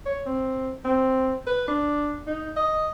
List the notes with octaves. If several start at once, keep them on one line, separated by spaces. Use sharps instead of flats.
C#5
C4
C4
B4
D4
D#4
D#5